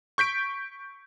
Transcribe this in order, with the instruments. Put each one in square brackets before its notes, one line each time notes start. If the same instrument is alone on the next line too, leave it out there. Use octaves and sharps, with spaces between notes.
[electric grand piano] C#6 G6 B6 D7